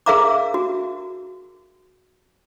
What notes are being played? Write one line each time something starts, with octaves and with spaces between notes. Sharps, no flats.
G#4 A#4 E5 F5 A#5 D6
F#4